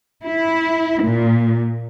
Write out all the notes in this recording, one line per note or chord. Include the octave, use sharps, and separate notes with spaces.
E4
A#2